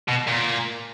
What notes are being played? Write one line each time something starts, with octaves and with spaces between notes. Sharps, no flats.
B2
A#2